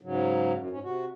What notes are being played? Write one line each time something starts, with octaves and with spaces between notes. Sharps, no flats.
G#2 C#3 F#3
F#2
G#2 C#4
C3 F#4